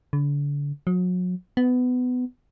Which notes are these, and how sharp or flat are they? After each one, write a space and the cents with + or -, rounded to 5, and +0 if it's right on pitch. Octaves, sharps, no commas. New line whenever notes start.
D3 -35
F#3 -35
B3 +20